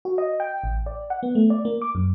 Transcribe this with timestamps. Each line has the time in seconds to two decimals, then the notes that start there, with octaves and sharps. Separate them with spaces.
0.05 F#4
0.18 D#5
0.40 G5
0.64 A1
0.86 D5
1.10 F#5
1.23 B3
1.35 A3
1.50 D5
1.65 A#3
1.82 D6
1.95 F#2